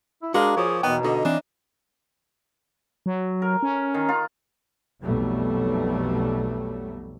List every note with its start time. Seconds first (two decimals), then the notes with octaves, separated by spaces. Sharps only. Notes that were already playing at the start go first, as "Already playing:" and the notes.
0.22 E4
0.34 G#3 A#3 D4 F#4 D#5 F5
0.57 F3 G#4 C#5 D6
0.83 E2 B2 B3 D#4 G5
1.04 D3 F#4 D#5
1.25 E3 C4 D4
3.06 F#3
3.42 A#4
3.63 C#4
3.94 D#3
4.09 F4
5.02 B1 F2 B2 F#3 G3 A3